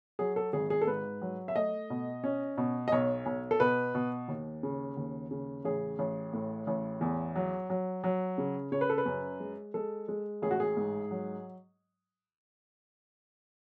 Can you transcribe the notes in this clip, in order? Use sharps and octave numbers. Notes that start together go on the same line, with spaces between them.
F#3 G#4
A4
G#1 G#4
G#4
A4
G#2 B4
F#3
E5
A3 D#5
B2
C#4
B2
D#5
B1 C#5
B1
A4
B2 B4
B2
D#2
C#3
D#2
C#3
A1 G#4
A1
A2
A1
E2
F#3
F#3
F#3
C#3
C#3 C#5
B4
A4
B4
F#2
G#3
G#3 A4
G#3
A1 G#4
F#4
G#4
G#2
F#3